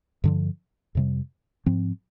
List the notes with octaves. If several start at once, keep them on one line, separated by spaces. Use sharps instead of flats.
G2 D3 F3
F2 C3 G3
G#2 F3 C4